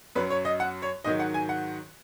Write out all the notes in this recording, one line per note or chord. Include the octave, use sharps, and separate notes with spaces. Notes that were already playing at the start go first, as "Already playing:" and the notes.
F#2 F#3 B4
C#5
D#5
F#5
C#5
G#2 D#3 F#3 D#5
F#5
G#5
F#5